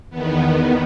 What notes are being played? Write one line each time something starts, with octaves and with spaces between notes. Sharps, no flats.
E2 D#3 B3